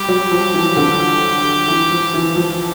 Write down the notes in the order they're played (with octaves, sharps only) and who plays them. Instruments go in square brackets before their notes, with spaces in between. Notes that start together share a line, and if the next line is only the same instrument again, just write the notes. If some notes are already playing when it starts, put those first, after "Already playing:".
Already playing: [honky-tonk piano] G3 [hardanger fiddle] G4
[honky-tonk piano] F#3
F3
E3
D3
E3
F3
E3
F3